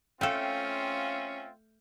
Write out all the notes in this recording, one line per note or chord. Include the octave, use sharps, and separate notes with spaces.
A3 C4 C#4 F4 A4 E5 F5 G5